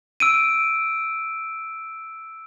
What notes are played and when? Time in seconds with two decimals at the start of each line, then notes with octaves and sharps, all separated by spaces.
0.20 E6 D7 D#7